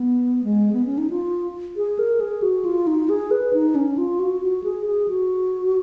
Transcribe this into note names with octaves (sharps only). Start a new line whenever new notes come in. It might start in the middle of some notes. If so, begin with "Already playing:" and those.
Already playing: B3
G#3
B3
C#4
D#4
F4
G#4
A#4
G#4
F#4
F4
D#4
G#4
B4
D#4
C#4
F4
F#4
F#4
G#4
G#4
F#4